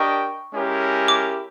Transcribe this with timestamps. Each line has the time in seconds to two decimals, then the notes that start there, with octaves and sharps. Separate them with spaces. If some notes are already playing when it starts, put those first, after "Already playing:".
Already playing: D4 G4 A#4 D#5 G5 C#6
0.53 G#3 C#4 E4 G4 A#4
1.08 D6